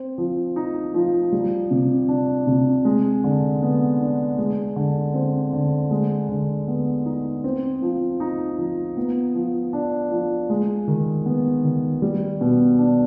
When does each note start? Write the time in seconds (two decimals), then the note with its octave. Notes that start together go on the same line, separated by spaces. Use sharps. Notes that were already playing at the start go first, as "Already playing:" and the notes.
Already playing: C4
0.18 F3
0.56 D#4
0.94 F3
1.32 G3
1.71 C3
2.09 D4
2.47 C3
2.85 G#3
3.24 D3
3.62 B3
4.00 D4
4.38 G#3
4.76 D3
5.14 C4
5.53 D3
5.91 G#3
6.29 D3
6.68 B3
7.05 D#4
7.44 C4
7.82 F3
8.20 D#4
8.58 F3
8.97 B3
9.35 F3
9.73 D4
10.11 F3
10.50 G#3
10.88 D#3
11.26 B3
11.64 D#3
12.02 G3
12.41 B2
12.79 D4